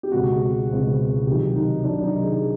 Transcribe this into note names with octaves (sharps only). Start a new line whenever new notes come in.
G4
C#2 B2 G#3 C4 F#4
C#2 B2 G#3 C4
C2 C3 D#3 F#3 G4
D#4
C2 C3 D#3 F#3 D4
D#4
G#4